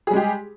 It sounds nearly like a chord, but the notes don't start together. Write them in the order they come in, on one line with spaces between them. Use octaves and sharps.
G#4 G3 G#3 G4